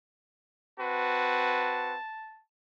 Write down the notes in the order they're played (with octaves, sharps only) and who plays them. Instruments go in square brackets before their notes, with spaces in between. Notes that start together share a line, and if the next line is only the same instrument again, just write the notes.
[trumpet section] C4 F#4 B4 [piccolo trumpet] A5